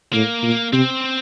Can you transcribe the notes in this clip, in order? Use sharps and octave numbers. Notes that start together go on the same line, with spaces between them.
A2 A#3
A#2
C3 C4